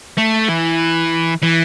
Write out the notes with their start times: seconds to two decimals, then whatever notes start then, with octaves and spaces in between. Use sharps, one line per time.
0.18 A3
0.49 E3
1.42 E3